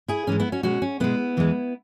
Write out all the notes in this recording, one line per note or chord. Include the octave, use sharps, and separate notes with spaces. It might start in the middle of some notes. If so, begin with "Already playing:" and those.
E4 G#4
G#2 E3 G#3 C#4
B3 E4
C#4 F#4
B2 G#3 C#4 F#4
C#4
B2 G#3 B3 E4
E2 E3 G#3